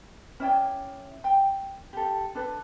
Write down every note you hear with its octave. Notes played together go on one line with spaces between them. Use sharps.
C#4 E4 D5 G5
G5
G4 A4
D4 A4 B4